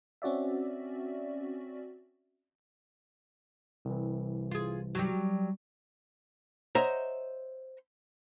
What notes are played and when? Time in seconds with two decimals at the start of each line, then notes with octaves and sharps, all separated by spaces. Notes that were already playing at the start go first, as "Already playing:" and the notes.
0.22 C4 C#4 F#4 D5 E5
3.85 C2 E3
4.51 F4 G#4
4.95 F#3 G3
6.75 C5 C#5 D#5 E5 F#5 A#5